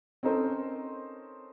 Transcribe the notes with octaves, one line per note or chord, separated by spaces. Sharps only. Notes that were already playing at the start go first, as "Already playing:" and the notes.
C4 C#4 D#4 A4 A#4 C5